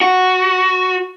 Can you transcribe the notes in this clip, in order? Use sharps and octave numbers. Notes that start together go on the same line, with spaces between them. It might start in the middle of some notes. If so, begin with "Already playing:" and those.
F#4